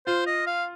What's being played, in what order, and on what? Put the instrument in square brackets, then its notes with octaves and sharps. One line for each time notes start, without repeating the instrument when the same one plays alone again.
[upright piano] F4 [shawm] C5
[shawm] D#5
F5